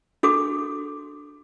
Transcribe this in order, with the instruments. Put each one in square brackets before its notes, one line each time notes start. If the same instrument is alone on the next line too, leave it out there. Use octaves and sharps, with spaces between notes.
[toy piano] D4 F#4 A4 D6